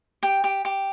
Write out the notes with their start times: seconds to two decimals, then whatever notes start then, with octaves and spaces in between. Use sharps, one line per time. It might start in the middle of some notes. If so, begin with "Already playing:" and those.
0.23 G4 G5
0.44 G4
0.65 G4